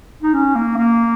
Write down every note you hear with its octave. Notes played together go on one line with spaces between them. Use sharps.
D#4
C#4
A#3
A#3